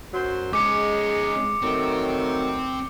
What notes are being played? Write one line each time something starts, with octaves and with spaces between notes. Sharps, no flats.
F#2 F#3 C5
G#3 C#4 D#4 D6 C#7
D#3 F#3 A3 C4